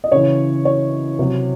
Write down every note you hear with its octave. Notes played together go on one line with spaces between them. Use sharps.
D#5
C#3 E3 C#5
C#5
C3 F#3